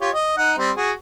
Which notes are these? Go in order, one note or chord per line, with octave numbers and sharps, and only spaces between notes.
F4 G4 C#5
D#5
D#4 F#5
G3 C4
F#4 G#4